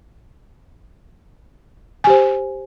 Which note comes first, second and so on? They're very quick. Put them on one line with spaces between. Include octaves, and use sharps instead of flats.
G#5 G4 C5